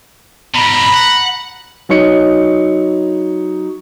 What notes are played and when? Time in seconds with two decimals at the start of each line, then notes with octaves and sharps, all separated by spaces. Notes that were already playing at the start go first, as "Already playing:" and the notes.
0.54 G#2 B2 A#5 B5
0.94 F#5
1.89 F#3 D#4 C#5 C#7